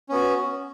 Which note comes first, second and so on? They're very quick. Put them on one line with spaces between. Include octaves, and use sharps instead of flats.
C#4 B3 F#4